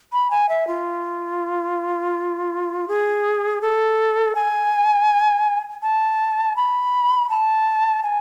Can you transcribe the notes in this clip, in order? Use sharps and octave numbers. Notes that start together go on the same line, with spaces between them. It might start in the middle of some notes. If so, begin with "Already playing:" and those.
B5
G#5
E5
F4
G#4
A4
G#5
A5
B5
A5
G#5